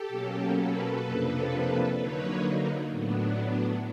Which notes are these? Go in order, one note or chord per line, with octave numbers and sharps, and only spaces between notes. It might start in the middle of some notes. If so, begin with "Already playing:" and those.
Already playing: G4 A4
B2 F#3 A#3 C#4
A4 B4
F2 C3 F3 A#3 D4
D3 F#3 A#3 D#4 B4 C#5
A2 F#3 B3 D4